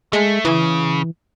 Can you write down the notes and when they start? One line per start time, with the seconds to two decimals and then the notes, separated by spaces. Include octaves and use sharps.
0.13 G#3 A3
0.45 C#3 E3